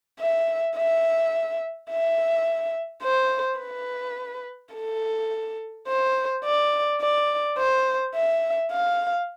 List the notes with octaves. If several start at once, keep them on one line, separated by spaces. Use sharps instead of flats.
E5
E5
E5
C5
B4
A4
C5
D5
D5
C5
E5
F5